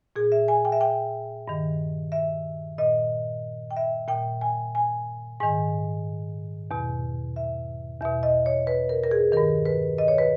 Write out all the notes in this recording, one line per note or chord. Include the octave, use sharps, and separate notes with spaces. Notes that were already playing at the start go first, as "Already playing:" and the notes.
A#2 G#4
E5
G#5
G5
E5
G5
G2 D#3
E5
A#2 D#5
G5
E5
A#2 G5
G#5
G#5
G#2 D#3 G#5
E2 B2
E5
E2 B2 E5
D#5
C#5
B4
A#4
A#4
G#4
G2 D#3 A#4
B4
D#5
C#5
B4